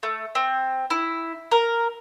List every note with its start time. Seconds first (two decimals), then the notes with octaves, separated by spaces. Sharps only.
0.03 A3
0.35 C4
0.90 E4
1.51 A#4